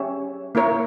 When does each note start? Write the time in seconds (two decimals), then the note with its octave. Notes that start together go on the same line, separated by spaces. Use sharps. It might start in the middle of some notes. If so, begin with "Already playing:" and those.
Already playing: C#4 G4 C#5 E5
0.55 A#3 E4 A#4 C#5